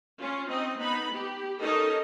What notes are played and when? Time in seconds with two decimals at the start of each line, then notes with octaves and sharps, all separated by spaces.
0.19 C#4 F4
0.48 C4 D#4 D#5
0.77 B3 D#4 B5
1.12 G4
1.60 C#4 D#4 A4 A#4 D#5